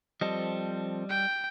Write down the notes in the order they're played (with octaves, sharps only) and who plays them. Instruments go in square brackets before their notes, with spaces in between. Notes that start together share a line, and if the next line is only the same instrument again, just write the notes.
[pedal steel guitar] F3 C4 A4 [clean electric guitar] G3 D#5
[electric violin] G5